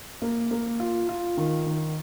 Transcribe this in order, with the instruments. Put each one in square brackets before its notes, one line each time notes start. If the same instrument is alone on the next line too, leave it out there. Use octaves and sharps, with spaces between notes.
[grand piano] A#3
A#3
F4
F4
D#3
D#3